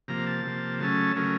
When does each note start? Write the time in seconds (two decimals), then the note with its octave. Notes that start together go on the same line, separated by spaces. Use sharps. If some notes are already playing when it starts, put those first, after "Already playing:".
0.08 C3 F3 A#3 A#5
0.27 A5
0.44 C3 F3 A#3
0.80 C#3 F#3 A3 C#4 A5
1.16 C#3 F#3 A3 C#4 A#4